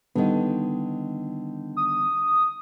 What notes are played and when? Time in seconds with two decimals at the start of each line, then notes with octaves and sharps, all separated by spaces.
0.16 D3 D#3 G3 B3
1.77 D#6